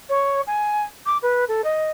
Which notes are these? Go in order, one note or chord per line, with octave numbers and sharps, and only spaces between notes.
C#5
G#5
D6
B4
A4
D#5